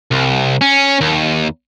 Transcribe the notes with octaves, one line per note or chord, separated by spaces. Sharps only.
C2
C#4
D#2